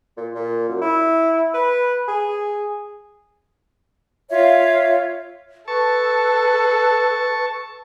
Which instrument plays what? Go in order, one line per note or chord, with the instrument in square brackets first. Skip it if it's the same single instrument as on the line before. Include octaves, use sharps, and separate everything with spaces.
[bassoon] A#2
A#2
F#2
E4
B4
G#4
[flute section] F4 C#5 E5 F5
[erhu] A4 [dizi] B4 [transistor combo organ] A5 C#6